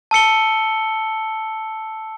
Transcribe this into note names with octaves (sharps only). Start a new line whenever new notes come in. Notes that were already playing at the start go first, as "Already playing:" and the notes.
A5 E6 C#7 G7